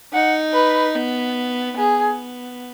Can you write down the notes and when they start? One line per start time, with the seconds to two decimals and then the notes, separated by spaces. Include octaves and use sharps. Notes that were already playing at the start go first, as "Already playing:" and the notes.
0.13 D#4 F#5
0.54 B4
0.95 B3
1.77 B3 G#4